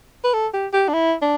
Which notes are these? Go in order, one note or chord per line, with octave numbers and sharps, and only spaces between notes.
B4
A4
G4
G4
D4
E4
D4